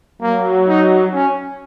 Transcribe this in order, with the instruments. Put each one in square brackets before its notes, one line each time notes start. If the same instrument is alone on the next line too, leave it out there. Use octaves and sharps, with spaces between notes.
[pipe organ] F#3 [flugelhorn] A#3
[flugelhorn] D#4
C#4